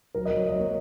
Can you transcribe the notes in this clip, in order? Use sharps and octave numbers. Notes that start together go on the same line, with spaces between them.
F#3 A#4
D#5
F#3
C#5
F#3 D#5
A#3 C#5